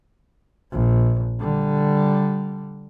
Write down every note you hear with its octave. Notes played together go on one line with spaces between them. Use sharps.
A#1
D3 G3